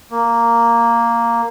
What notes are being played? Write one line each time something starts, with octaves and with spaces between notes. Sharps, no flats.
A#3